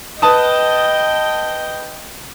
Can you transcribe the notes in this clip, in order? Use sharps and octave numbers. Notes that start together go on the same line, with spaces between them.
B4 D#5 G5 A5 D#6